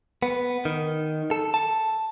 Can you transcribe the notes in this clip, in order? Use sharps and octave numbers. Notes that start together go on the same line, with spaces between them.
B3
D#3
A4
A5